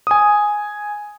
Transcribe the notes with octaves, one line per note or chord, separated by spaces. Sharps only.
G#5 D#6